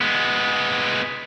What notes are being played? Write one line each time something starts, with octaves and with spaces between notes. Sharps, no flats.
G#3 B3